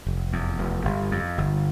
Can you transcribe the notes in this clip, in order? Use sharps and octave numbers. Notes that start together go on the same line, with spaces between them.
F1
E2
F1
G1
F2
G1